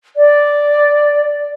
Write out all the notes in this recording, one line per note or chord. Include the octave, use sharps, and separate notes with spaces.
D5